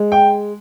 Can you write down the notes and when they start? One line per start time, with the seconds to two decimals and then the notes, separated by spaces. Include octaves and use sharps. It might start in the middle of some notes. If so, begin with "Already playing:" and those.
Already playing: G#3
0.12 G5